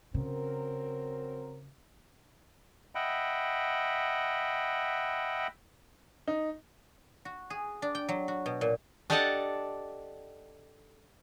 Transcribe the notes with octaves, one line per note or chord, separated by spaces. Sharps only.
C#3 F#3 C4 A#4
D#5 E5 F#5 G5 B5
D#4
F#4
G#4
D4
G5
F#3
F#4
B2
A#2
D4 G4 A4 D#5 F#5 A5